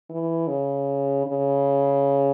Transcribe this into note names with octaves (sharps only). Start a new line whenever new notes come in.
E3
C#3
C#3